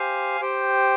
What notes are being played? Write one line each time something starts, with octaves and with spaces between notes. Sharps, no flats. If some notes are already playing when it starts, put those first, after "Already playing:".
Already playing: G4 C5 F5 G#5
G4 C5 G5